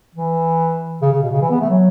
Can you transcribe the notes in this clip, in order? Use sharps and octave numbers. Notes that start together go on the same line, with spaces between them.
E3
C#3
C#3
B2
C#3
E3
B3
A3
F#3